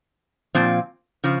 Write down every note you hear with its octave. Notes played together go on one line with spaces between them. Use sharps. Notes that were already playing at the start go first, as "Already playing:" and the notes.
A#2 F3 C4
C#3 F3